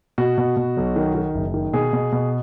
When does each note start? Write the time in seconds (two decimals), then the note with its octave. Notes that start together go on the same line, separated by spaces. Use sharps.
0.18 B2 F#4
0.38 B2
0.57 B2
0.77 B1
0.96 D#3
1.15 D#3
1.35 F#1
1.54 D#3
1.73 B2 G#4
1.93 B2
2.12 B2